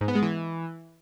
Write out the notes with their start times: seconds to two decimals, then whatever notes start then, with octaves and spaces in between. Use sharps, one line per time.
0.01 G#2
0.08 B3
0.15 G#3
0.22 E3